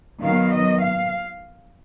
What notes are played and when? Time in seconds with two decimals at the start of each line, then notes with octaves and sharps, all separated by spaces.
0.23 D#3 F#3 B3 F5
0.51 D#5
0.81 F5